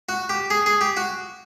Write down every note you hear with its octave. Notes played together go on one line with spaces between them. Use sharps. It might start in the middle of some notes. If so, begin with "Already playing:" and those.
F#4
G4
G#4
G#4
G4
F#4